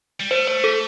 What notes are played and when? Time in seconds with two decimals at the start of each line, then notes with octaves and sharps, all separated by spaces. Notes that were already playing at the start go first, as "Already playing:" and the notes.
0.20 G3
0.31 A3 C5
0.47 C5
0.64 A4